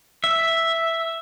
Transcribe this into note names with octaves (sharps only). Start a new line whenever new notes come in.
E5